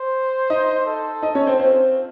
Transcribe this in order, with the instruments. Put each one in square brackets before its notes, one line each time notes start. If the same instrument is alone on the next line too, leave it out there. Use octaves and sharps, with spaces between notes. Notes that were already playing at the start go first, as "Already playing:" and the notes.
Already playing: [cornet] C5
[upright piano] D#4 D#5
[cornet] A4
[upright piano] D#4 D#5
C#4 C#5
C4 C5
[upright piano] C4 C5 [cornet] F4